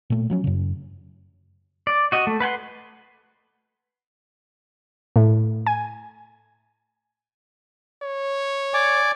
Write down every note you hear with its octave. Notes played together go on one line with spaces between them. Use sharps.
A#2 A3
F3 F#3 C#4
F#2 C#3
D5
F#4 D#5
A3
B4 F#5 G#5 C6
A2
G#5
C#5
D5 G#5 D6